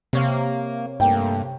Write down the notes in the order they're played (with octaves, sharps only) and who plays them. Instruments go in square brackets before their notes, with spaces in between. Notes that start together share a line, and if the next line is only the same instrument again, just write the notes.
[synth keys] C3 C#5 F5 [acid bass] A#3
[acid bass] G2 [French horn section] A3 A#3 [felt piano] G5